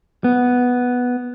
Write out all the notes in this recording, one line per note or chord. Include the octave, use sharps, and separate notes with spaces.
B3